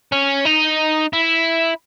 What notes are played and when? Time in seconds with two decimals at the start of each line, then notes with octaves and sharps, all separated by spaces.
0.12 C#4
0.45 D#4
1.13 E4